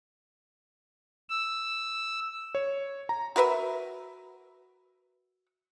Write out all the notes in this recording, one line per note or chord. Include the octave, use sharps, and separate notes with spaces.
E6
C#5
A#5
F#4 A#4 B4 E5